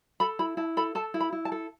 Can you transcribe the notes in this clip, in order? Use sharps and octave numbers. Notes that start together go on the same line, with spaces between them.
A4 B5
E4 B5
E4 A5
A4 B5
A4 A5
E4
B5
E4
A5
A4